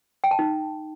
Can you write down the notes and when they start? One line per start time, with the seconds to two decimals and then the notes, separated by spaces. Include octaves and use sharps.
0.24 G5
0.31 A5
0.39 D#4